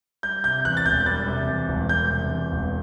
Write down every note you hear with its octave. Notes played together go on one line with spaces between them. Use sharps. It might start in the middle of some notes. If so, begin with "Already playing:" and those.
G3 G6
C3 G6
E2 F#6
A6
E1 G6
G3 A6
C3
E2
E1
G3 G6
C3
E2
E1